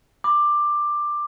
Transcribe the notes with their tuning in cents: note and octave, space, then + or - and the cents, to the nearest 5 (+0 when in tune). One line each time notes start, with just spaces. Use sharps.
B5 +0 D6 +10